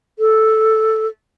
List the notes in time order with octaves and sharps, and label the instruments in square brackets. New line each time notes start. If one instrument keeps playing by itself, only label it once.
[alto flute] A4